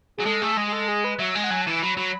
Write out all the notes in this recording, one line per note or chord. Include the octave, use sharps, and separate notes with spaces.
F#3 G#4
G#3 A4
A3 G#4
A4
G#3 G#4
G#4
A4
G#4
B4
F#3 E5
G#3 G#5
F#5
F#3 G#5
A5
E3 G#5
F#3 B5
F#3 B5